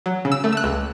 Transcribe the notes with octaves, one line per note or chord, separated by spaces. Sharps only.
F#3
C#3
E6
A3
E6
F#6
C#2